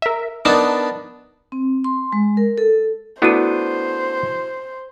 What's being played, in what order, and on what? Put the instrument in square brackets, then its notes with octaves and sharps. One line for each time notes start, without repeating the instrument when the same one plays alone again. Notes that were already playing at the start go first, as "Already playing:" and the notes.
[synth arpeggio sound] A#4 E5
[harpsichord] B3 D4 D#4 [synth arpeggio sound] A#4 A5
[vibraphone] C4
C6
G#3
A#4
A4
[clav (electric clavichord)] A3 B3 D4 [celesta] E4 F#4 D#7 [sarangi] C5